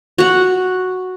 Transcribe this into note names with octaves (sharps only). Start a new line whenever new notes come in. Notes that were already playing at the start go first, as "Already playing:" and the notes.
F#4 F#5